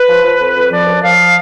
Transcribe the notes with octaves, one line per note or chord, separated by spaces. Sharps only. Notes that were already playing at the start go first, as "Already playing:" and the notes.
Already playing: B4
F3
F3
F2
F2
F3 D5
F#2
F3 F5